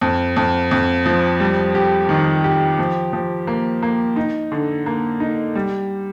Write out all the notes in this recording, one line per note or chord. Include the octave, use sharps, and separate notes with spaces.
F2
F2
F2
F3
G3
G4
D#3
G4
F3
F3
A#3
A#3
D#4
D3
A#3
D#4
G3